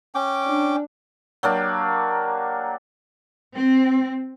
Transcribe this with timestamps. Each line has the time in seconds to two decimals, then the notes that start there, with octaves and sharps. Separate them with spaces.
0.15 C#4 G5 D6
0.45 D4
1.43 F#3 A#3 D4 G4
3.55 C4